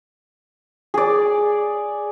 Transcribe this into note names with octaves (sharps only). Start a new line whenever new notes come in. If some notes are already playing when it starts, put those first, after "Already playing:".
G#4 D5